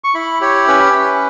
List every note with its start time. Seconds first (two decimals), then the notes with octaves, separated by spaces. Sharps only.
0.04 C#6
0.15 E4 B5
0.41 G4 C#5
0.68 C#4 B4
0.93 C#4